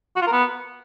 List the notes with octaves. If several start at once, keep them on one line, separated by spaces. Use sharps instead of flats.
F#4
F4
A#4
B3